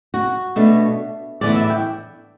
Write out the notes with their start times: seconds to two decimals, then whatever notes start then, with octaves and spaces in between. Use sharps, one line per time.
0.14 F#4
0.56 B2 A3 D4
1.41 A2 E3 B3 D5
1.55 E5
1.70 G5